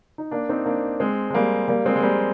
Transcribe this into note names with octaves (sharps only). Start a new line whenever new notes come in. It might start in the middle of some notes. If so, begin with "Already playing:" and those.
D#4
A#3 D4
C4 D#4
A#3 D4
G#3 C4
G#3
G3 A#3
G3 A#3
G#3 C4
G#3
G3 A#3